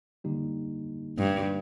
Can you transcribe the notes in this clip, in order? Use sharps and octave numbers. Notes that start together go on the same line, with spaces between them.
D3 G3 A#3 D#4 G4
G2